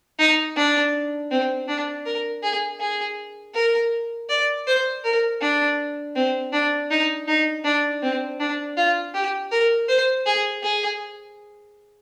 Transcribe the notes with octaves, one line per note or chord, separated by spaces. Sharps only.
D#4
D4
C4
D4
A#4
G#4
G#4
A#4
D5
C5
A#4
D4
C4
D4
D#4
D#4
D4
C4
D4
F4
G4
A#4
C5
G#4
G#4